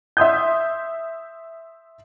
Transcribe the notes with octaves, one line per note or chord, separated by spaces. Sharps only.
E5 C6 D#6 G6